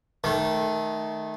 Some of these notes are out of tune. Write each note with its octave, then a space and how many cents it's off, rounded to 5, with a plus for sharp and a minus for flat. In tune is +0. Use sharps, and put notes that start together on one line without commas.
D#3 +0 A3 -20